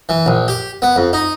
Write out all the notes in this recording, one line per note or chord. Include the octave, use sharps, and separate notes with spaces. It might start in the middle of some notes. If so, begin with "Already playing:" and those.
E3
A#1
G4
B3
F2
D#4